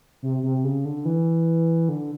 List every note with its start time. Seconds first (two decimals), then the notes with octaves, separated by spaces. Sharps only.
0.23 C3
0.43 C3
0.64 C#3
0.85 D3
1.05 E3
1.89 D3